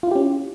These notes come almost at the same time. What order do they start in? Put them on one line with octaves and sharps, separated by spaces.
F4 E4 G4 C#4